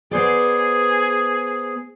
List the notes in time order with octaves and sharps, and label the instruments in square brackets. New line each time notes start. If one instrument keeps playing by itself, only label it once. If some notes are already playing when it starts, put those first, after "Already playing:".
[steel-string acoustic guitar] B3 C5 D5 [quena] G#4